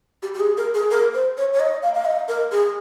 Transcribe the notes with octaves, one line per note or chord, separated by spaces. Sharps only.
G4
G4
G#4
A#4
G#4
A#4
C5
C#5
C#5
D#5
F5
F5
D#5
A#4
G#4